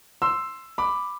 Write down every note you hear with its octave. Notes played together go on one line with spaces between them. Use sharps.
C6 E6
B5 D6